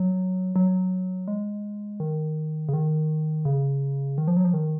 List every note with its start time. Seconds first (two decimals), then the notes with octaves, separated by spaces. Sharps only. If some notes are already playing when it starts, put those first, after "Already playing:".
Already playing: F#3
0.56 F#3
1.28 G#3
2.00 D#3
2.69 C#3
2.73 D#3
3.45 C#3
4.18 D#3
4.27 F3
4.36 F#3
4.45 F3
4.54 D#3